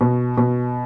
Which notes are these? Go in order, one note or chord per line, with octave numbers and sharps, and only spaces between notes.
B2
B2